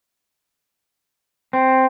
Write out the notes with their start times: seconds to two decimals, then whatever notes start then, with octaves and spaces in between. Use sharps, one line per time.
1.53 C4